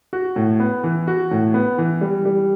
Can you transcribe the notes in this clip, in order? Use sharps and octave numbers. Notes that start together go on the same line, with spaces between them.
F#4
A2
B3
E3
F#4
A2
B3
E3
G3
G3